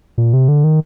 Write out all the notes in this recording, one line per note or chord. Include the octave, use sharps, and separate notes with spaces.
A#2
C3
D3
D#3